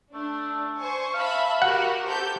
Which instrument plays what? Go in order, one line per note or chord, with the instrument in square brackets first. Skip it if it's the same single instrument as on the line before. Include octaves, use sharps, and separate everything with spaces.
[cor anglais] A3 [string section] D4
[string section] C5 G#5 C#6
[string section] E5 A5 B5 [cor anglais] F5
[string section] F#4 G4 A#4 [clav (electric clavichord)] F#5
[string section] G4 A4 G6 [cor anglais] C5